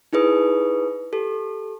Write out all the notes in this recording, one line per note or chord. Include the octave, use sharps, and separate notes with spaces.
D#4 E4 G#4 B4 D#6
G4 A4